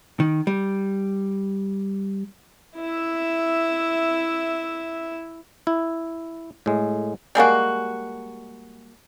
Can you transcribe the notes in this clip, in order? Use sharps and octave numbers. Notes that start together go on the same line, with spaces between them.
D#3
G3
E4 E5
E4
A2 G#3
G3 G#3 A#3 F#4